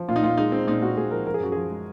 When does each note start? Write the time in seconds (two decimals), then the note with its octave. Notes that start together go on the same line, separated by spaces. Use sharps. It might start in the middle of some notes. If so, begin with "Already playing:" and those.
Already playing: F3
0.08 A#2 F4
0.16 D#4
0.22 A#2 F4
0.37 G#3 D#4
0.52 G#3 C4
0.67 A#2 D#4
0.82 A#2 F#4
0.97 A#2 G#4
1.11 F3 A#4
1.26 F3 A#4
1.34 G#4
1.40 F#2 F#4
1.52 F3 G#4
1.70 G#3